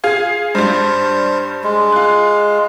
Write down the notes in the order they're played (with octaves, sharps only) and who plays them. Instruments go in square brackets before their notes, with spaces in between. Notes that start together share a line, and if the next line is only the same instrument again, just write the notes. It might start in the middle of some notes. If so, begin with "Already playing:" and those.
[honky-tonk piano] F4 G#4 F5
[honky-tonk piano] G2 G3 [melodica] C5
[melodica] G#3
[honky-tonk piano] F4 F#6